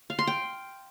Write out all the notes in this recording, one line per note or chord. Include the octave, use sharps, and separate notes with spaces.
F5
C6
G5